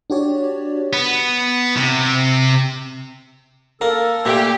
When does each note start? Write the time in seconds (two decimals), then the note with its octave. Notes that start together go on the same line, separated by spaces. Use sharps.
0.10 D4 F#4 G4 C#5 D5
0.93 B3
1.77 C3
3.81 A#3 A4 A#4
4.25 A#2 A3 G4